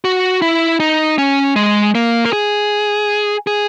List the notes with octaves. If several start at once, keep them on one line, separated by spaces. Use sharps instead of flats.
F#4
E4
D#4
C#4
G#3
A#3
A#4
G#4
G#4